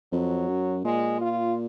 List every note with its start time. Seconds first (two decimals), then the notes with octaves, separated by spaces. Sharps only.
0.12 F2 F#3
0.48 F#2
0.84 A#2 G#3
1.21 F4